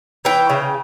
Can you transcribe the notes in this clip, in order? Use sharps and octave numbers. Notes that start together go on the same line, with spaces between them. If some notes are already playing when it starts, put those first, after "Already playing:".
E3 G5
C#3